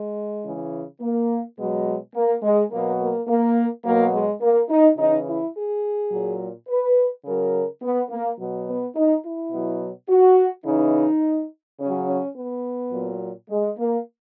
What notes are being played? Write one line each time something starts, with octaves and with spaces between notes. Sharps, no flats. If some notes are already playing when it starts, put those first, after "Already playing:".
Already playing: G#3
C#3 E3
A#3
B2 F#3 G#3
A#3
G#3
B2 F#3 A#3
A#3
A#3
B2 F#3 A#3
G#3
A#3
D#4
C#3 E3 D#4
E4
G#4
A#2 F#3
B4
C#3 F#3 A#4
B3
A#3
B2 F#3
B3
D#4
E4
B2 F#3
F#4
C#3 E3 D#4
C#3 F#3 C#4
C#4
B3
A#2 F#3
G#3
A#3